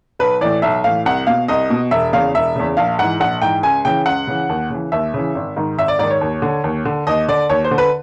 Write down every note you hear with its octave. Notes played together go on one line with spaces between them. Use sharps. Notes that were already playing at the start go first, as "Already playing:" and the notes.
B1 B4
A2 E3 D5
B1 E5
A2 E3 F5
C2 F#5
B2 F5
C2 D#5
B2
E1 E5
E2 C#3 F5
E1 E5
E2 C#3
A#1 F5
G#2 E3 F#5
A#1 F#5
G#2 E3 G5
C#2 G#5
C#3 E3 G5
C#2 F#5
C#3 E3
D#2
C#3 E3
D#2 E5
C#3 E3
G#1
G#2 D#3
G#1 E5
D5
G#2 D#3 D5
C#5
D#2
D3
D#2
D3
D#2 D#5
D3 D5
D#2 C#5
C5
D3
B4